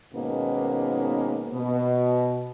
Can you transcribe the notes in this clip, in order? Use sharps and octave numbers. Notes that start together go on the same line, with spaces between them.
G#2 B2 D#3 A#3 B3 C#4
B2